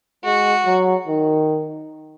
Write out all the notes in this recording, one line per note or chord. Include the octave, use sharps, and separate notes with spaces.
G#3 F#4
F#3
D#3